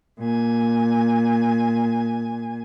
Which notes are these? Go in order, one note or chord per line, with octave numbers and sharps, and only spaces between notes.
A#2 G#5